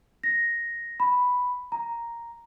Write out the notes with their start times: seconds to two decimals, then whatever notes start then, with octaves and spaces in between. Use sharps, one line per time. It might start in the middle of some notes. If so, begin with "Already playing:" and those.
0.23 A#6
1.00 B5
1.72 A#5